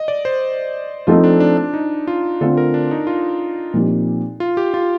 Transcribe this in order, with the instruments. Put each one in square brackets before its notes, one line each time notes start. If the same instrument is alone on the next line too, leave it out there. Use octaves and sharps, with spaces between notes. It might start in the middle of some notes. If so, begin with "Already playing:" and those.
Already playing: [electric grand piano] D#5
D5
C5
[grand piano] F3 A3 C4 D#4 A4 [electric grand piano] F4
[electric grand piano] D4
D4
D4
D#4
F4
[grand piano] D3 A3 C4 F4 [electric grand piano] A4
[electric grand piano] A#4
D4
D#4
F4
[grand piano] A#2 F3 C4 D#4 G4
[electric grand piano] F4
G4
F4